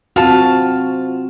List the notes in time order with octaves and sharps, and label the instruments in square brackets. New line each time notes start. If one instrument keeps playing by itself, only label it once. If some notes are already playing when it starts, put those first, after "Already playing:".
[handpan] C4 F#4 [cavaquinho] F4 A5